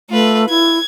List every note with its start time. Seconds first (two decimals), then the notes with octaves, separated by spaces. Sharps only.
0.10 A3 F4 B4
0.49 E4 G#6